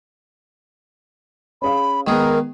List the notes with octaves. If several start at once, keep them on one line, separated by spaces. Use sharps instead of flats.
C#4 G#4 F5 B5
D#3 G#3 B3 G#4 A#4